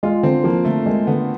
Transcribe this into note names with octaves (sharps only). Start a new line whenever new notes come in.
G#3 F4
D3 C4
F3 A#3
D3 A3
G#3 A#3
D3 B3